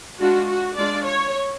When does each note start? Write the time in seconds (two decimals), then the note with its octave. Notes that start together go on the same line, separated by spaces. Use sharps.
0.19 G#3 D4 F4 F#4
0.48 F#4
0.77 G#3 D4 F4 D5
1.06 C#5